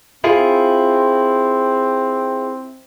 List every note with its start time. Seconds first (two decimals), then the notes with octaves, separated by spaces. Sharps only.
0.24 C4 E4 F4 G#4